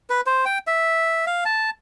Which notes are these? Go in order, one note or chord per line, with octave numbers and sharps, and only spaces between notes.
B4
C5
G5
E5
F5
A5